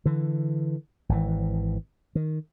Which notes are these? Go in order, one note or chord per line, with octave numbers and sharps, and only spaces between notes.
D3 E3
G#1 E3
D#3